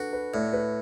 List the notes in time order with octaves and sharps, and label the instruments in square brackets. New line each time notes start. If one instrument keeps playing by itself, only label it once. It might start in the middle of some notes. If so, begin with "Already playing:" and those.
Already playing: [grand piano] D4 A4 B4 [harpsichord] F#4
[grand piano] B4
[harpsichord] A2 [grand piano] D5
[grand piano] B4